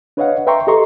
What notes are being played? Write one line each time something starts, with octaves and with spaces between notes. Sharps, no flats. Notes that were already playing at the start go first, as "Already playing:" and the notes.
D4 B4 C#5 D#5 F5 F#5
B4 E5 G5 A#5 C6 C#6
G4 A4 D#5 A#5 C6 C#6